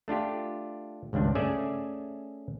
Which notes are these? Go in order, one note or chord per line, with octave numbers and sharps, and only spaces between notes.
A3 D4 F4 G4
G#1 C#2 G2 D4
A3 C#4 G#4 D5 E5 G#5